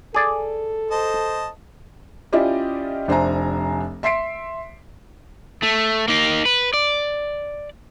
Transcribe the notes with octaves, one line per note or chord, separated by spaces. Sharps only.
G#4 A4 D5
C5 D#5 A5
C#4 E4 F4 G4 D5 D#5
F1 D4 C5 E5 G#5 A#5
E5 C6 B6 C7 D7
A3
A#3 D#4
B4
D5